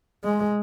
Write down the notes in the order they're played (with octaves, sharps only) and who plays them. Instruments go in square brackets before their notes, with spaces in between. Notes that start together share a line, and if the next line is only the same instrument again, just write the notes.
[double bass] G#3